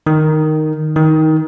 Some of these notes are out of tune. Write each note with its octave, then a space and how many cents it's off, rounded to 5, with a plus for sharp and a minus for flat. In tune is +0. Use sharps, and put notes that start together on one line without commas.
D#3 -5
D#3 +15